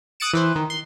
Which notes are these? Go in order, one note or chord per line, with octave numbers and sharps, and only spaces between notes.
D#6 F#6 A6 C#7 D7 E7
E3 B4 C5
D#3
C6